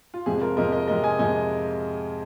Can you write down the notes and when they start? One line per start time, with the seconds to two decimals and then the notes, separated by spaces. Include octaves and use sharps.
0.14 F4
0.26 F2 C3 G#3 G#4
0.41 F4 A#4
0.57 F2 C3 G#3 A#4 D#5
0.72 A#4 D#5
0.87 F2 C3 G#3 A#4 D#5
1.04 D#5 G#5
1.19 F2 C3 G#3 D#5 G#5